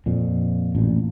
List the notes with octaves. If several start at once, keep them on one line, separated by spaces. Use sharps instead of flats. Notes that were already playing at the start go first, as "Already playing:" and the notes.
F2 A#2
A1 A#2